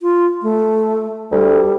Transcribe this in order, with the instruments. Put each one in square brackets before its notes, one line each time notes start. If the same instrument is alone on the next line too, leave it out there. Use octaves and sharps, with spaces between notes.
[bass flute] F4
A3
[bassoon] D2 [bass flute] G3